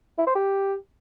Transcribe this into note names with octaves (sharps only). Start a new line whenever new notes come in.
E4
C5
G4